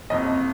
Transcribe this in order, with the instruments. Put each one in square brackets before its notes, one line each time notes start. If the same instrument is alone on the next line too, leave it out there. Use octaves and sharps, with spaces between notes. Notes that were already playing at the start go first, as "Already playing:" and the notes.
[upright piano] F#1 F2 C3 D#5